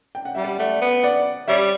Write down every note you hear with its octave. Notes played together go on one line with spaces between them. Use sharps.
G5
F#5
G3 E5
D5 F#5
A3 D5 F#5
B3
D5 F#5
G3 C#5 E5